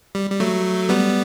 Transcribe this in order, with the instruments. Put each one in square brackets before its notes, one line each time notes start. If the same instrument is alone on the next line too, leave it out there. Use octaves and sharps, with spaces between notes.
[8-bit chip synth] G3
G3
F#3 A3
G3 B3